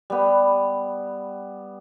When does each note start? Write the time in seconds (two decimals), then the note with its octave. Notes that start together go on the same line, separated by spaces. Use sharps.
0.10 G3 B3